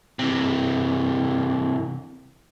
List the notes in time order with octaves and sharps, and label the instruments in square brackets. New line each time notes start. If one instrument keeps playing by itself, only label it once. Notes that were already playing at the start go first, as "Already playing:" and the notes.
[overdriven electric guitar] C3 E3